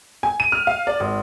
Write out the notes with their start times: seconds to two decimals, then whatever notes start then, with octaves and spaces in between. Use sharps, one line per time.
0.23 G#5
0.40 D#7
0.52 F6
0.67 F5
0.87 D5
1.00 G#1